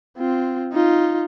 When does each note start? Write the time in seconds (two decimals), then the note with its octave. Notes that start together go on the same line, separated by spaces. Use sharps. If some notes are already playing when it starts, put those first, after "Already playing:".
0.17 C4 F4
0.73 D#4 F4